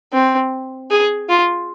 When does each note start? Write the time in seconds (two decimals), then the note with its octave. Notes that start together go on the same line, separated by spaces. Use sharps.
0.13 C4
0.91 G#4
1.29 F4